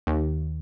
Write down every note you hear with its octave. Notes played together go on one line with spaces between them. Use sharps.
D#2